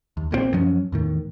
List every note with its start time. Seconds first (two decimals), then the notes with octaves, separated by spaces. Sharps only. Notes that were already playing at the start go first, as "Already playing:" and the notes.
0.17 D#2
0.31 A#1 A#2 F3 C4
0.53 F#2 F3 F#3 C#4
0.92 E2 A2 D#3